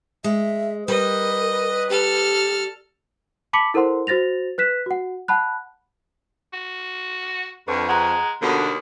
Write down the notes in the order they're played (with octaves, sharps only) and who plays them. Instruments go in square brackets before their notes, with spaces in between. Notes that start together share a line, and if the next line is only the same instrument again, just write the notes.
[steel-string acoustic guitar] G#3 [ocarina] E5
[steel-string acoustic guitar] G3 [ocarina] A#4 [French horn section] B4 [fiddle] D#5
[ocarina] G4 [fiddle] A4 F6
[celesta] A5 B5 D6 B6 C#7 F#7
E4 A4 A#4 C5 F#5 C6
F#4 C5 A6 A#6 F7
B4 F#6 B6 E7
F#4 F#5
F#5 A5 B5 F#6
[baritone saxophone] F#4
[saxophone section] F2 [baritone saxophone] D3 [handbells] B4 C#6
[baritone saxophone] G#3 [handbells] F#5 A#5 F#6
[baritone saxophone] D#2 [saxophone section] B2 D3 [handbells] A#4 D#6